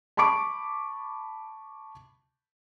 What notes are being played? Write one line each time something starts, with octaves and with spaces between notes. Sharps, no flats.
A5 B5 C#6 D6 D7